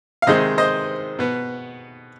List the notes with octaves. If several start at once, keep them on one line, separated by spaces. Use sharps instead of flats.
F5
C3 D#3 G#3 C5 D#5
C5 D#5
B2 B3